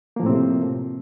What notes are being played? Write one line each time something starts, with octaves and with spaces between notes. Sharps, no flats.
A2 C3 F3 A#3 C4